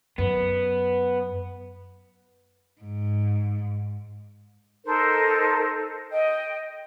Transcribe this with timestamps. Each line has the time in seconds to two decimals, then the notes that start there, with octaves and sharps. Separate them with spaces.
0.18 F#2 B3
2.79 G#2
4.86 D#4 A4 A#4 C5
6.11 D#5 G5